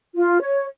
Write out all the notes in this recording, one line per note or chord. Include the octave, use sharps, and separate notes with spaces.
F4
C#5